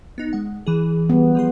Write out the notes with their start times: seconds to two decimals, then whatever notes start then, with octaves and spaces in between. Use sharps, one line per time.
0.18 B3 D#4
0.33 G#3 F#5
0.66 E3 G#4
1.10 G3 B3
1.35 F3 G#4 C6